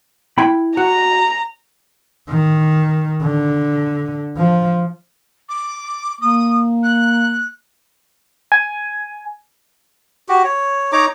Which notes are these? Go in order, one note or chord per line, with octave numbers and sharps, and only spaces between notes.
E4 G5 B5
F#4 A#5
D#3
D3
F3
D6
A#3 D#6
F#6
G#5
F#4 G4
C#5
D#4 C#5 A#5 D6